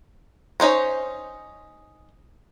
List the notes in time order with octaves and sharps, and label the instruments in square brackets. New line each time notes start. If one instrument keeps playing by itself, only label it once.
[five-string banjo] C#4 D#4 C5 C#5